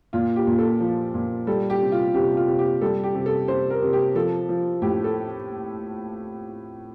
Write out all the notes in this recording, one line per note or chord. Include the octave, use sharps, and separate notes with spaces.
A#2 F4
G4
A#2
A4
F3
A#2
G3 A4
G4
C3
F4
C3 G4
F4
C3
G4
G3 A4
G4
C3
A4
C3 C5
A#4
C3
G4
F3 A4
F3
A2 G4
A4